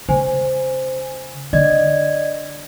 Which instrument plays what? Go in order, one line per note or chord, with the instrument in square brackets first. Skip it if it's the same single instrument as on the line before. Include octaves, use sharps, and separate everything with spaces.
[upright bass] C#3 [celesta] C5 G#5
[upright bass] D3 [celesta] D5 D#5 G#6